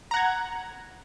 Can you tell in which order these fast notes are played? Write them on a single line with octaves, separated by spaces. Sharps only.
A#5 F#5 G#6